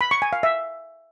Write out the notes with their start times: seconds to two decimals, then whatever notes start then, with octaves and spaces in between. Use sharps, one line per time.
0.01 B5
0.11 C#6
0.22 G#5
0.33 F5
0.43 E5